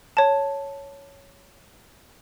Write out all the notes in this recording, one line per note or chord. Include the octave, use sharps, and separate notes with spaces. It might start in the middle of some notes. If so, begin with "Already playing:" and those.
C#5 A5